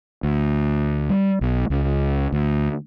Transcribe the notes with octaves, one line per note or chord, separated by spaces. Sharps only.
D2
G3
B1
C#2
D2